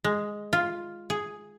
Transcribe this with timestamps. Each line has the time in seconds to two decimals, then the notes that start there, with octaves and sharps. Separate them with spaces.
0.04 G#3
0.53 F4
1.10 G#4